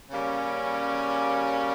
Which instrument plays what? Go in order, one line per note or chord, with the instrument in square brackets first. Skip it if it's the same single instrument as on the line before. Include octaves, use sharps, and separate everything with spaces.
[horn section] C#3 G3 A#3 C#4